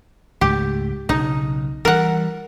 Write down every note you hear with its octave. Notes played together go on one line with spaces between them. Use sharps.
C#2 G#2 A3 G4
B1 C#3 D#4
E3 G3 A#4 F#5